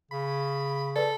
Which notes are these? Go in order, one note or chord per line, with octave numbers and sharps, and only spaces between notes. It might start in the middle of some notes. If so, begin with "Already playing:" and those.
C#3 B5
A4 B4 D5